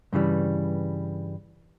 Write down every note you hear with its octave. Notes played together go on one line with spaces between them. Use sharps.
G2 C#3 E3 G3